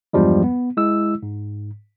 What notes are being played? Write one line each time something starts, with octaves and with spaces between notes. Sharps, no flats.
E2 G2 F3 G3 G#3
B3
G#3 E4 E6
G#2